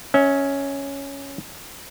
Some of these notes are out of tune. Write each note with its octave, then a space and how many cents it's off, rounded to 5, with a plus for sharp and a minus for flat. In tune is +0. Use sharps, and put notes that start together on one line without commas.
C#4 +0 E5 -35